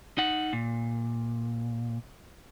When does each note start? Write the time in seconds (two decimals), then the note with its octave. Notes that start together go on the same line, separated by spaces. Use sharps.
0.18 D#4 F#5
0.53 A#2